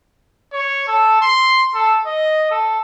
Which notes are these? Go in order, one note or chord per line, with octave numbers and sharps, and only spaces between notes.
C#5
A4
C6
A4
D#5
A4